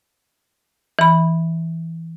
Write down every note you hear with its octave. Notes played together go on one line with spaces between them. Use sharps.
E3 B5